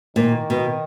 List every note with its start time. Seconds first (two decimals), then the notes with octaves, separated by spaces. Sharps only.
0.16 A#2 D#3
0.50 B2